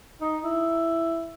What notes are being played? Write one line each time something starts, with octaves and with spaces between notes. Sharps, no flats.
D#4
E4